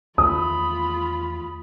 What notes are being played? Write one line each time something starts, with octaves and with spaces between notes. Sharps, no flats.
E2 D#3 A3 F4 B5 D#6